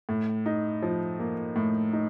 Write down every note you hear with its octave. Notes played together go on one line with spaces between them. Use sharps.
A2
D#4
F3
A#3
A2
D#4